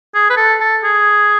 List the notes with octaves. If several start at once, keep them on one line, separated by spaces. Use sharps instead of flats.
G#4
B4
A4
A4
G#4